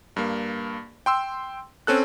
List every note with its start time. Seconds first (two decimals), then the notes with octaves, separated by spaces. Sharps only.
0.16 G2 A#3
1.06 G5 C6 E6
1.87 C4 C#4 A4 F#6